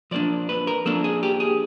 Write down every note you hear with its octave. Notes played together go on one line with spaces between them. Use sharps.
F3 A#3 D4 D5
B4
A#4
F3 A#3 D4 A4
G#4
G4
G#4